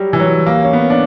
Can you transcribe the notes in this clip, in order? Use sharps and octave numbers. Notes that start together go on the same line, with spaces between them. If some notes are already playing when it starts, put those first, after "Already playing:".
Already playing: F#3 G3
E3
F#3
A#3
C#4
B3
D4